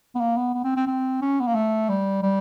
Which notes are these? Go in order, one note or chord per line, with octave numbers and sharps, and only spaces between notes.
B3
A#3
B3
B3
C4
C4
C4
C#4
B3
A#3
A3
G3
G3